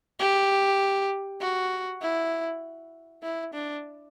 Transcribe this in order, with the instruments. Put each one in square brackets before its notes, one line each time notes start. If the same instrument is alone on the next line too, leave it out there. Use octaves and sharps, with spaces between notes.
[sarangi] G4
F#4
E4
E4
D4